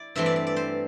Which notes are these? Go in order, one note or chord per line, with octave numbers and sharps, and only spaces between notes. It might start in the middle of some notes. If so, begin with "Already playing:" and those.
Already playing: E4 D5
G2 E3 A3 C4 E5
D5
D5
D5
C5